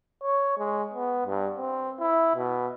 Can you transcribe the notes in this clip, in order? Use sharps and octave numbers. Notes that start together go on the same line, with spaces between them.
C#5
G#3
B3
G2
C4
E4
B2